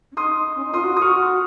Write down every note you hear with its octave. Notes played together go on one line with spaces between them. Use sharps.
C#4
D#4 C6 D#6
C#4
D#4
F4 C6 D#6
F#4
D#6
F#4 C#6 F6